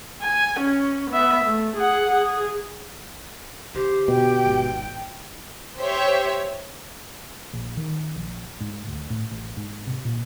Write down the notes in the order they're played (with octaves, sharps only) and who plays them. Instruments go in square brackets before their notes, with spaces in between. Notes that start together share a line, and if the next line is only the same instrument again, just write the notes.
[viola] G#5
C#4
B3 E5
A3
G#4 F#5
G#4
[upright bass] D3 [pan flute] G4 [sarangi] C5
[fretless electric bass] B2 [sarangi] G5
[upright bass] G#1
[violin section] G4 C5 C#5 E5 B6
[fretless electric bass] A#1
D#3
A#1
G#2
D2
A2
A1
G#2
C3
A#2